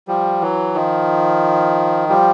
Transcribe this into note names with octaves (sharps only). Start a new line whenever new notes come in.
F3 G3
E3 F#3
D#3 F3
F3 G3